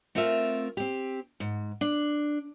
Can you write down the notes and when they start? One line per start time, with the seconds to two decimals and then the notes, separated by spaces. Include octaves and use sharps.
0.15 A3 C4 F4 A#4 E5
0.77 C4 G4
1.40 G#2
1.81 D4